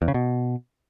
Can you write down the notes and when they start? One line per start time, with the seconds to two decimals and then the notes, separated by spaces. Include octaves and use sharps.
0.02 E2
0.08 C#3
0.14 B2